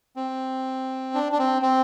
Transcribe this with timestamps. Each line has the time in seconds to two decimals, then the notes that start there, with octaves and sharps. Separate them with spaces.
0.16 C4
1.14 D4
1.32 D4
1.39 C4
1.62 C4